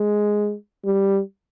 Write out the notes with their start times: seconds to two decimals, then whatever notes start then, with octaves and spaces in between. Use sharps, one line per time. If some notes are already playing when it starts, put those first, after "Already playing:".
Already playing: G#3
0.85 G3